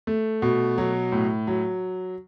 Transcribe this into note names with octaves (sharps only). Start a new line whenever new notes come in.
A3
B2
F#3
A2
F#3